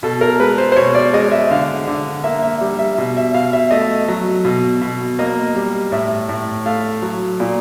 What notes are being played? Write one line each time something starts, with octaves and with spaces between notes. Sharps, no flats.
B2 A4
A#4
G#3 B4
C5
C5
B2 C#5
D5
G#3 D#5
E5
D3 F5
D3
A#3 E5
E5
G3
E5
B2
E5
B2 F5
E5
A3 D#5
F#3
B2
B2
A#3 D#5
G3
A2 E5
A2
A3 F5
F#3
A#2